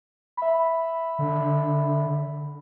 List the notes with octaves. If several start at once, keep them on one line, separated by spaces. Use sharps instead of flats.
E5 B5
D3